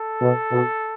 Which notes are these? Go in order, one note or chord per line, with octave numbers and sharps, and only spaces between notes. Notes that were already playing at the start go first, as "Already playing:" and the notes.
Already playing: A4
B2
B2